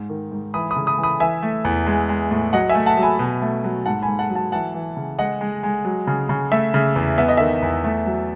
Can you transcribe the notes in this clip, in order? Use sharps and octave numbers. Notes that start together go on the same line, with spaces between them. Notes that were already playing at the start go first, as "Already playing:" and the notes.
Already playing: G#2
D#3
G#2
E3 B5 D#6
B5 D#6
C#3
B5 D#6
E3
B5 D#6
E3 E5 G#5
A3
E2
G#3
G#3
A2
F#3 D#5 F#5
E5 G#5
A3
F#5 A5
F#3
G#5 B5
B2
A3
F#3
G#2 F#5 A5
G#5 B5
G#2
F#5 A5
F#3
F#5 A5
E3 F#5 A5
E3
C#3
G#3 D#5 F#5
G#3
G#3
F#3
C#3
C#3
A3 E5
C#3
E2
B3 E5
D#5
D#3 E5
E2
A3
F#3